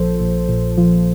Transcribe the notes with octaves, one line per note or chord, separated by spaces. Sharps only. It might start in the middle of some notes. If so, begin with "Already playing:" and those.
Already playing: A#1 A#2 F3 A4 C5
A#1
A#2
F3